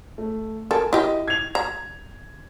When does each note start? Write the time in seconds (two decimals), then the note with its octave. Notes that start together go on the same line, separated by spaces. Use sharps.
0.18 A3
0.71 A4 A#4 G#5
0.93 E4 G4 D#5
1.28 G#6 F7
1.55 A#5